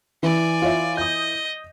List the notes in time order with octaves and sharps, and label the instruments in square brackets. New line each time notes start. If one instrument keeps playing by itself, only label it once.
[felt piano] E3 [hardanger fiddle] D5 G#5
[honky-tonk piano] F4 C#5 E5
[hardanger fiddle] D#5 [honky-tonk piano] D#6 G6